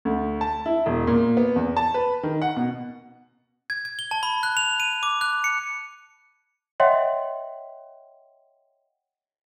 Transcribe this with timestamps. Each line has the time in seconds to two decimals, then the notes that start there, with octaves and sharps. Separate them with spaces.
0.05 D2
0.41 A5
0.66 E4
0.86 E1
1.07 A#2
1.37 B3
1.56 E2
1.77 A5
1.94 B4
2.23 D#3
2.42 F#5
2.56 B2
3.70 G#6
3.85 G#6
3.99 G7
4.11 A5
4.23 B5
4.43 F#6
4.57 F7
4.80 D#7
5.03 D6
5.21 F#6
5.44 C#7
6.80 C#5 D#5 E5 F#5 G5 C6